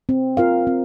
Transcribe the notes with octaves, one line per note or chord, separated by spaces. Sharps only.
C4
F4 A#4 F5
C4